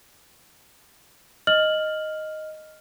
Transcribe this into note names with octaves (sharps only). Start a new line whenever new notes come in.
D#5 F6 F#7